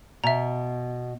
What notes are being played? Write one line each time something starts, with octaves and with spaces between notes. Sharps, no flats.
B2 E5 A#5